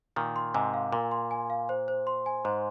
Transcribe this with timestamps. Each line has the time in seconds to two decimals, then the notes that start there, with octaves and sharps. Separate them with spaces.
0.16 A#2 D#3 A#4
0.36 C6
0.54 G#2 C3 G#5
0.74 F5
0.93 A#2 A#4
1.11 C6
1.31 G#5
1.50 F5
1.69 C5
1.88 C5
2.07 C6
2.26 G#5
2.45 G#2 C5